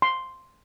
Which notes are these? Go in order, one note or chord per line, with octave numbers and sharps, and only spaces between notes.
C6